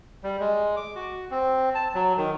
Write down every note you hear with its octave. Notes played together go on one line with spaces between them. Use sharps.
G3
G#3
D6
F#4
C4
A5
F#3
D#3